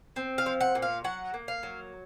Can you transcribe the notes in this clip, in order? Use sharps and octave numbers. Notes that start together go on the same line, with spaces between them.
C4
F5
F3
F#5
A#2
F5
F#3 F#5
A#3
F5
F#3